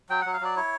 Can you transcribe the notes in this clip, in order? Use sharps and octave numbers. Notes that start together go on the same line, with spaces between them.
F#3 G5
F#3 F#5
F5
F#3 D5
E4 C#5